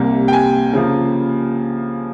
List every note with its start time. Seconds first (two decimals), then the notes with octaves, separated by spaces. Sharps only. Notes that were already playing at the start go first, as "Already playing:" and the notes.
Already playing: C2 C3 G3 A#3
0.28 G5
0.33 G#5
0.73 C#3 F3 A#3